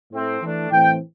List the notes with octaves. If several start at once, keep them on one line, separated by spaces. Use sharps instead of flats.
A2 A3 C4
E3 A3 D4
A2 E3 A3 C4 G5